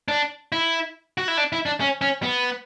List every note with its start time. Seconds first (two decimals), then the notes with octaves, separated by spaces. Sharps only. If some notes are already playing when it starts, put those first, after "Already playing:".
0.08 D4
0.52 E4
1.18 F#4
1.28 E4
1.37 D4
1.53 E4
1.66 D4
1.81 C#4
2.01 C#4
2.23 B3